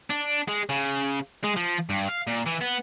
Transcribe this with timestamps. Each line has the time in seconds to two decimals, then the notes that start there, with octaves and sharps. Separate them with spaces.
0.10 D4
0.48 G#3
0.70 C#3
1.44 G#3
1.56 F3
1.90 G2
2.09 F5
2.27 A#2
2.47 E3
2.61 B3